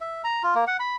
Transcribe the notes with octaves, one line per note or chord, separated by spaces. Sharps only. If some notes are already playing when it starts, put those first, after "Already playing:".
E5
A#5
F4
A#3
F#5
B5